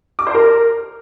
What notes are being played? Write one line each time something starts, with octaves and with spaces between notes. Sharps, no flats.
D6
C5
A#4